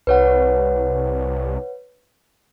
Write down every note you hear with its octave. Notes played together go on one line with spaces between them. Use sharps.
C2 B4 C#5 F#5